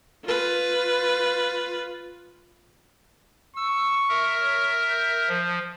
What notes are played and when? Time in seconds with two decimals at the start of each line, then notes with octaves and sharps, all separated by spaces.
0.25 F4 B4
3.56 C#6 E6
4.09 A#4 E5
4.42 C#5
4.90 G6
5.29 F3